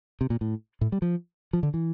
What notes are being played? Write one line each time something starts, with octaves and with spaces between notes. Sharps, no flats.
C3
A#2
A2
A2
G3
F3
F3
D3
E3